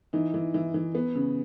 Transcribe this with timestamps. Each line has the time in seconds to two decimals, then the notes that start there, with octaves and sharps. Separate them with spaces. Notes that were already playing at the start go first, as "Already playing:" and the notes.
0.13 E3 D#4
0.34 E3
0.54 E3
0.74 E3
0.95 B3
1.15 C#3